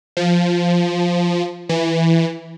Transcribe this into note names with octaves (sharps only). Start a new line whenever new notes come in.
F3
E3